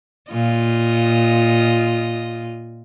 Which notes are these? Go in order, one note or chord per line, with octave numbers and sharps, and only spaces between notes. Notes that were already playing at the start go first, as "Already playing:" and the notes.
A#2 F4 D#5